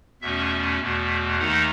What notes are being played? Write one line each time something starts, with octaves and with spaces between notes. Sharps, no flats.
E2 B2 A3 C#4 E5
E2 B2 A3
D#2 D#3 A3 D#4 F#5